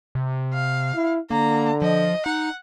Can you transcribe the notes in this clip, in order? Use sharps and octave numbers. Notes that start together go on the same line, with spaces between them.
C3
F5
E4
D3 A#3 A#5
F3 D#5
D#4 F#5